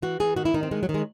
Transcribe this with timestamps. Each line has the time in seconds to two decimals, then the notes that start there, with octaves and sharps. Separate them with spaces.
0.02 E3 F#4
0.20 E3 G#4
0.36 D#3 F#4
0.45 E4
0.54 D#3 D#4
0.63 C4
0.71 D#3 G#3
0.83 F#3
0.89 D#3
0.94 G#3